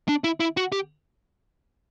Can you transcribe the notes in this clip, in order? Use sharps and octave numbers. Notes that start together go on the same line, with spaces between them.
D4
E4
E4
F#4
G4